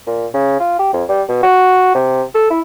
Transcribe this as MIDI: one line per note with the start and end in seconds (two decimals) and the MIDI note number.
0.07 0.27 46
0.34 0.59 49
0.60 0.79 65
0.79 0.90 67
0.93 1.04 41
1.09 1.23 55
1.29 1.39 47
1.43 1.91 66
1.95 2.23 48
2.35 2.46 69
2.50 2.60 64